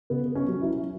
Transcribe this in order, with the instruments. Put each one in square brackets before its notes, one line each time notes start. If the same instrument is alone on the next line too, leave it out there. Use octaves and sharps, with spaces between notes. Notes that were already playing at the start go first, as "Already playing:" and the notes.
[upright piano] C#3 B3
C#4
F#3
E4